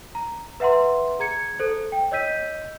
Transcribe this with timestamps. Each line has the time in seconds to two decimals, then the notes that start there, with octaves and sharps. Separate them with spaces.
0.15 A#5
0.60 B4 E5 F#5 A#5 C6
1.19 G#4 A#5 G#6 C#7
1.59 A4 C5
1.92 G5
2.11 C#5 D#5 E6 G6 B6 D#7